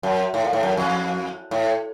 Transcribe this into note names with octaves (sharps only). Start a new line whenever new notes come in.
F#2
A2
A#2
A2
F#2
F2
A2